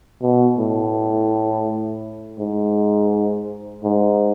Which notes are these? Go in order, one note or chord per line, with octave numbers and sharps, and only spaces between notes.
B2
A2
G#2
G#2